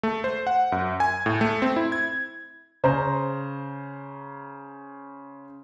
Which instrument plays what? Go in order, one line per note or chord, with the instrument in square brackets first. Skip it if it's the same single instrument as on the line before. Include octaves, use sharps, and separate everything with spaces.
[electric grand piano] A3
C5
F#5
F#2
G#5
A2
A3
C4
E4
G#6
[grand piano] C#3 C5 A#5